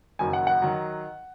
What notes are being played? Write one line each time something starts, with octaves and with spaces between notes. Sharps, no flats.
F#1 F#2 D#3 F#3 G#5
F#5
F#5
D#3 F#3